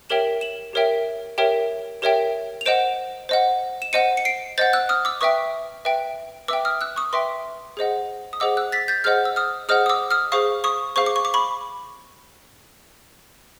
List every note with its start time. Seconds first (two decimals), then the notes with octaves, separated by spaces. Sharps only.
0.10 G4 A#4 C#5 E5 G5 E7 F#7
0.41 E7 F#7
0.73 G4 A#4 C#5 E5 G5
1.38 G4 A#4 C#5 E5 G5
2.02 G4 A#4 C#5 E5 G5
2.61 F7
2.66 C5 D#5 F#5 D7 E7
3.29 C5 D#5 F#5
3.82 E7
3.93 C5 D#5 F#5 C#7 D#7
4.17 C#7
4.25 C7 D7
4.58 C5 D#5 F#5 G6 A6
4.73 E6 F#6
4.89 D#6 F6
5.05 D6 E6
5.21 B4 E5 G5 C#6 D#6
5.85 B4 E5 G5
6.48 B4 E5 G5 D6 E6
6.65 D#6 F6
6.81 E6 F#6
6.96 C#6 D#6
7.13 B4 E5 G5 C6 D6
7.77 G#4 C5 D#5 F#5
8.33 D#6
8.40 G#4 C5 D#5 F#5 D6 E6
8.57 E6 F#6
8.72 A6 B6
8.88 G6 A6
9.04 G#4 C5 D#5 F#5 F6 G6
9.25 E6
9.36 D#6 F6
9.69 G#4 C5 D#5 F#5 D#6 F6
9.86 D#6
9.89 D6 E6
10.11 D#6 F6
10.32 G#4 C5 F5 C#6 D#6
10.64 C#6 D#6
10.96 G#4 C5 F5 C#6
11.06 D6
11.16 C#6
11.25 D6
11.34 B5 C#6